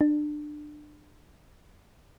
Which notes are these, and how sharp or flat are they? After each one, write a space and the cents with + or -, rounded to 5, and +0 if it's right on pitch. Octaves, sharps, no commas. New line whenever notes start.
D4 +25